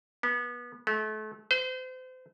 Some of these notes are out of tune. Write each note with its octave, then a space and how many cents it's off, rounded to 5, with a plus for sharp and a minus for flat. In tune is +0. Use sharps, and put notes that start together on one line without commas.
B3 -25
A3 -35
C5 -35